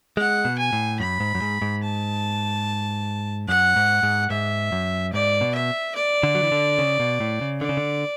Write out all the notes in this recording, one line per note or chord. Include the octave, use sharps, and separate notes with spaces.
G#3 F#5
B2
G#5
A2
F#2 B5
G#2
F#2
G#2
G#2
A5
F#2 F#5
G#2
G#2
G#2 E5
F#2
G#2 D5
B2
E5
D5
D3
F#3
E3
D3
C#3
B2
A2
C#3
D3 D5
C#3
D3